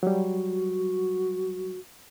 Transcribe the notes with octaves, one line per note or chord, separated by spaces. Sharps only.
F#3 G3 F#4